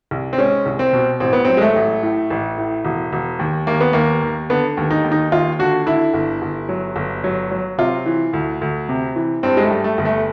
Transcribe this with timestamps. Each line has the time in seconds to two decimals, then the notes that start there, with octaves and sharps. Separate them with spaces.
0.11 C2
0.33 C4
0.38 G#3 C#4
0.66 C2
0.79 C4
0.93 B2
1.20 A1 C4
1.33 B3
1.45 F#3 C4
1.57 G#3
1.62 A3
1.76 A1
2.03 A2
2.30 A1
2.58 A2
2.85 E1
3.13 E1
3.39 D#2
3.67 D#2 A#3
3.81 B3
3.93 D#2 A#3
4.22 D#2
4.50 D3 B3
4.77 D#2
4.91 D#4
5.04 D#2
5.12 D#4
5.32 D#2 F4
5.59 D3 F#4
5.86 D3 E4
6.14 G1
6.42 G1
6.69 F#3
6.96 G1
7.24 F#3
7.51 F#3
7.78 C3 F4
8.06 E3
8.33 D2
8.61 D2
8.89 C3
9.16 E3
9.43 G2 C4
9.57 G#3
9.63 A3
9.71 G3
9.84 A3
9.98 G1
10.05 A3